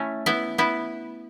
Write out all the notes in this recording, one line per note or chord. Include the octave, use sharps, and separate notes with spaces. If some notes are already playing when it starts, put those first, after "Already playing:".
Already playing: A3 C#4 E4
B3 E4
B3 E4